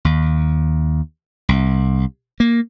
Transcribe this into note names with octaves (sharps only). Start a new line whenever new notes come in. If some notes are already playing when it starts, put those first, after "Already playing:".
D#2
C2
A#3